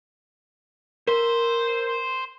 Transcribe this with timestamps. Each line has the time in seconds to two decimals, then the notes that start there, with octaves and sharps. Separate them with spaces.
1.07 A#4 C5 C6